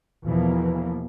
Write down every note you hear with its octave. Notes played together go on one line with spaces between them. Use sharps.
E2 B2 E3 F3 A#3